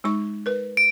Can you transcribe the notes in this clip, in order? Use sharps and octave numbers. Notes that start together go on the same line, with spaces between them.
G#3 D#4 C#6
A#4 B4
D7